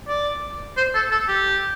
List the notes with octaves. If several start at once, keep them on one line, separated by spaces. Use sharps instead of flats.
D5
C5
A4
A4
G4